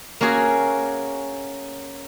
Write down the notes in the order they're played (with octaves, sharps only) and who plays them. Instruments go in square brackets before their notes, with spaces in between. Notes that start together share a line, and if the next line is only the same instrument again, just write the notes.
[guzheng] A#3 C#4 F#4 G#4